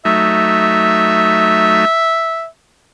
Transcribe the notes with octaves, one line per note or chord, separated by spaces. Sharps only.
F#3 A3 D#4 E5